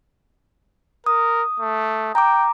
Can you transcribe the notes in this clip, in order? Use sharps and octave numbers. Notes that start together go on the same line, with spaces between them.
A#4 D#6
A3
G5 A#5 D6